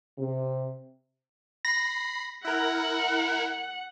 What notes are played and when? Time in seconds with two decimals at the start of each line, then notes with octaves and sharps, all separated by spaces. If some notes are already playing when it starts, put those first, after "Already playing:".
0.18 C3
1.65 B5 A#6 C7
2.45 E4 A#4 F#5